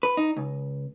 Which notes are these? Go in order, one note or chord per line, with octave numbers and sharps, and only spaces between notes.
B4
D#4
C#2